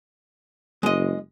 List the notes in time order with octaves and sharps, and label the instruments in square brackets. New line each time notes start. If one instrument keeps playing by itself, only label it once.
[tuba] F#1 [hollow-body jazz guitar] G#3 D#5